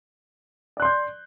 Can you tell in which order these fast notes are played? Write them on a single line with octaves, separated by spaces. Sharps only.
D5 F#6 C6 G6